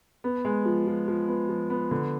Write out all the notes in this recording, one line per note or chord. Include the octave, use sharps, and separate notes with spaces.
B3
G#3
F3
F3
F3
B3
F3
B3
D3